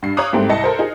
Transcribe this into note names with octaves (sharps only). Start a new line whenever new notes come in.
G2 C7
C#5 F5 A#5 D6 D#6 F#6
G#2 G3 A3 C4 G5
C2 D#5 E5 A5 C#7
A4 A#4 C5
D#4 F4 G#4